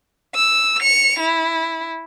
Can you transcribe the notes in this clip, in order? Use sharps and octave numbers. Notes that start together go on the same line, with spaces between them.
E6
C#7 F7
E4